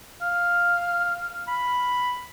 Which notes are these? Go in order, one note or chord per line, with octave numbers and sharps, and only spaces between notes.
F5
B5